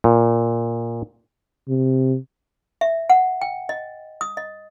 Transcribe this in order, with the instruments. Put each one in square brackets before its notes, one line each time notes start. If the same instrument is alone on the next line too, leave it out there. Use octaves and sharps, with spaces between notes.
[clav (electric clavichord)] A#2
[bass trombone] C3
[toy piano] E5
F#5
G5
D#5
D#6
D#5